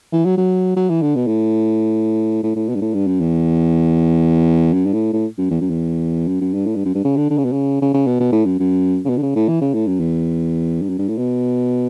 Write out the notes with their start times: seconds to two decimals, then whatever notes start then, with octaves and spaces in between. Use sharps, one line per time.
0.13 E3
0.25 F#3
0.37 F#3
0.76 F#3
0.89 E3
1.02 D3
1.16 B2
1.27 A2
2.43 A2
2.56 A2
2.69 B2
2.75 G2
2.81 A2
2.94 G2
3.07 F#2
3.21 E2
4.73 F#2
4.86 G2
4.93 A2
5.13 A2
5.38 F#2
5.50 E2
5.61 F#2
5.70 E2
6.28 F#2
6.41 F#2
6.54 G2
6.66 A2
6.76 G2
6.85 F#2
6.94 G2
7.04 C#3
7.17 D3
7.30 D3
7.38 C#3
7.45 B2
7.52 C#3
7.82 C#3
7.94 C#3
8.07 B2
8.20 B2
8.32 A2
8.45 F#2
8.59 F#2
9.05 C#3
9.09 B2
9.18 D3
9.22 C#3
9.35 A2
9.48 E3
9.61 C#3
9.74 A2
9.87 F#2
10.00 E2
10.82 G2
10.89 F#2
10.99 G2
11.09 A2
11.18 B2